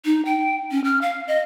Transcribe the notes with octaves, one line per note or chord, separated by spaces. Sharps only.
D#4
G5
C#4
F6
F5
D#5